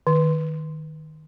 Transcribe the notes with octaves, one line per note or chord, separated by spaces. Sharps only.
D#3